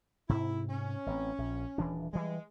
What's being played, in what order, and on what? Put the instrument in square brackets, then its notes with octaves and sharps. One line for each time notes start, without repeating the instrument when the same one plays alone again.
[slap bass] G#2 C3 [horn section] E4
[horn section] C#4
[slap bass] A1 C4
A#1
D#1 E3 D4
[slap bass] E3 G3 [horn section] G#3